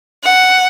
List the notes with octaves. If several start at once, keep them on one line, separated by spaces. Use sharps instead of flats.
F#5